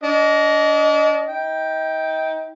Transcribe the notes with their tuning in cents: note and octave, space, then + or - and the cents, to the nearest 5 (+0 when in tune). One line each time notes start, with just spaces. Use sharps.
D4 -35 D#5 +0
D#4 +35 G5 +0